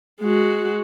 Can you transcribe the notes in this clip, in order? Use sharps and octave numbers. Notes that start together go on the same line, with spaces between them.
G#3 F#4